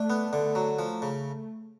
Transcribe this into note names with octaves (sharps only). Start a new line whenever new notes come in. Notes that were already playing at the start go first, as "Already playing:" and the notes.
Already playing: A3 D4
B3
D3
F#3
F3
C#3